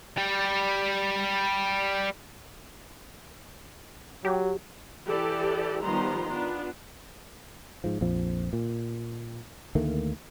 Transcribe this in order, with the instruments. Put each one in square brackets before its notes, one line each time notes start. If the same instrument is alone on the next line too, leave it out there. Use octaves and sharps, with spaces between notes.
[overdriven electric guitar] G3 G5
[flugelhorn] F#3 [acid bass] G4
[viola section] E3 G4 A4 D5
D#3 F3 G3 B3 A#5 C6
B3 D4 F4
[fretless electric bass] G#2 F3
A#1 F2 F3
A#2
D2 D#3 A3 A#3